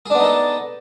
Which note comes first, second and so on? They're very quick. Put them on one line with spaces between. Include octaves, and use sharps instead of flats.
G#4 D4 B3 D#4 A4